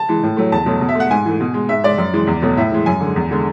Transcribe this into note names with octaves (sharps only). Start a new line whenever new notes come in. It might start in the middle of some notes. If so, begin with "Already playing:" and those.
Already playing: A5
E3 G#3
A2
F#3 A3
E2 A5
B2 F#3 A3
B2
E5
A3 F#5
G#2 G#5
E3 A3
B2
G#3
G#2 E5
G#3 D5
F#2
E3 G#3
E2
B2 F#3 A3
A2 E5
E3 G#3
F#2 G#5
D3 G#3
E2
D3 G#3